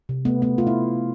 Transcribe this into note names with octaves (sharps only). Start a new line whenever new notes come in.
C3
A3 B3
A3 B3
A3 F4
E4